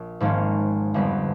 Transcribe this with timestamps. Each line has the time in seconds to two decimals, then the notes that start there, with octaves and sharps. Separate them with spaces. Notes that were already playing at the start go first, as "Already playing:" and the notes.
Already playing: A#1
0.20 G#1 G#2 F3 A#3 C#4
0.94 G1 F2 D3 G3 B3